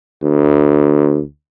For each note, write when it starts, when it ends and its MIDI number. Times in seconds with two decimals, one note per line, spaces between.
0.23 1.21 38